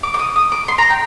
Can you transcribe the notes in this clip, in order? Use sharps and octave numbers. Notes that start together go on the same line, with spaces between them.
D6
D6
D#6
D#6
D6
C6
A#5
G5